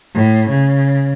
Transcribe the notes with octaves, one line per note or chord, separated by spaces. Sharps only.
A2
C#3